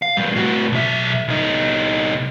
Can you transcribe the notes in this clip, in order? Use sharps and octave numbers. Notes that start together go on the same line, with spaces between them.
F5
A2 G3
A2 F#4
B1 E5
C2 D#4